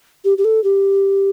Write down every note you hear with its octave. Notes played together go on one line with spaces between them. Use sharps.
G4
G4
A4
G4